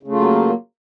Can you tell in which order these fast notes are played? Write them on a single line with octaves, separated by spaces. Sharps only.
C#3 A3 F4 F#3 A#3